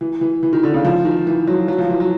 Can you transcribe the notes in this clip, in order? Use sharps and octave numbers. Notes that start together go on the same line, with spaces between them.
E3
E3
E3
D#3
D3
C#3
F3
D#3
E3
F#3
F#3
F3
E3
F#3